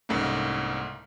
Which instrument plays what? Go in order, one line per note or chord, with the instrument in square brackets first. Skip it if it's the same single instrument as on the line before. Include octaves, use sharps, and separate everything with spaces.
[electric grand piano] C2 G#2 C#3 A3 A#3